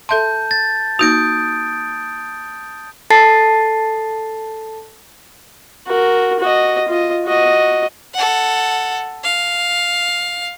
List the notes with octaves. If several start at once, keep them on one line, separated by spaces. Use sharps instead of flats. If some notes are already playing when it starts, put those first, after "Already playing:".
A4 E5 A5 C6 G6
A6
A#3 D#4 F#4 D#6 G6 D7
A4 A5 A6 C7
F#4 A#4
F#4 D#5
F4 D#5
F#4 D#5
A4 F#5
F5